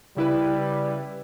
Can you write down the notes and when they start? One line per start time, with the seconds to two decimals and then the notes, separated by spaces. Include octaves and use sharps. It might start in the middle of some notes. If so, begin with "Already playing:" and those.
0.16 C#3 G3 E4 B4